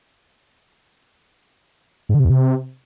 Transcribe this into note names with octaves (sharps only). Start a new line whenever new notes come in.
G#2
D3
C3
E2
C3